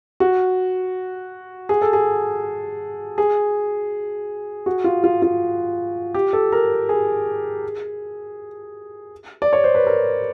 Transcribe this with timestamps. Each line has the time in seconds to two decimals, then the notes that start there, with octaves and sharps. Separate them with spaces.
0.20 F#4
1.69 G#4
1.82 A4
1.93 G#4
3.18 G#4
4.66 F#4
4.84 F4
5.04 F4
5.22 F4
6.14 G4
6.33 A4
6.52 A#4
6.89 G#4
9.42 D5
9.53 C#5
9.64 C5
9.75 B4
9.87 A#4